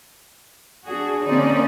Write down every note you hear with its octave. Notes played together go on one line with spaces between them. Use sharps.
D4 F#4 G#4
D3 A#3 C4 C#4 D#4 D5